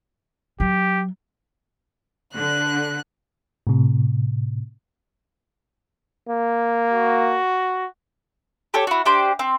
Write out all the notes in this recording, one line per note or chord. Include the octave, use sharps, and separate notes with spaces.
F#3 G4
D3 F#6
A2 C3
A#3
F#4
G4 A4 C#5
E4 F#4
D4 G4 C5
C4